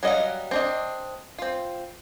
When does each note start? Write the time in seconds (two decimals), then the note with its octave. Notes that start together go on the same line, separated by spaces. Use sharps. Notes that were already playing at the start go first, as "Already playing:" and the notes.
0.03 F#3 G3 D#5 F5 F#5
0.51 C4 D4 D#5
1.38 C4 F4